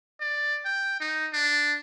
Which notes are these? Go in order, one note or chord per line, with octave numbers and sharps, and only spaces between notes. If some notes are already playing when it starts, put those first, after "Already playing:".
D5
G5
D#4
D4